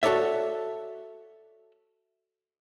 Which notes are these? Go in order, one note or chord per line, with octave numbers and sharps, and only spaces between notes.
F#4 A4 C#5 D5 E5